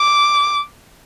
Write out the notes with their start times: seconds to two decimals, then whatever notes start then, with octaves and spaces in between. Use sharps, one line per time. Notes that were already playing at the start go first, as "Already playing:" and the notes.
Already playing: D6